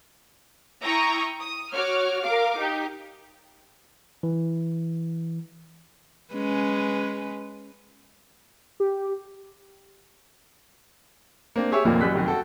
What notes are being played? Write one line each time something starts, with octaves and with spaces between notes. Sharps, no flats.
E4 G5 A#5 C#6 D#6
D#6
F#4 C#5 D6 F6
A#4 F5 D6
D#4 G4
E3
G#3 C#4 B4
G4
A#3 C4 D4
G4 G#4 C#5 E5 C#6 E6
F1 D#2 A#2 F3 A#3
A1 F#2 G4 E6 F#6 B6
F1 F#2 D#3
F#4 A4 G5